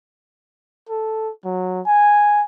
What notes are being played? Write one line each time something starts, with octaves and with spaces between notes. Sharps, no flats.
A4
F#3
G#5